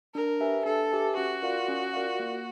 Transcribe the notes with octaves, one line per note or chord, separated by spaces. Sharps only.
D4 A#4
G4 B4 E5 G#5
D4 A4
G4 B4 E5 G#5
C#4 F#4
F4 A#4 D5 F5
C#4
F4 A#4 D5 F5
A#3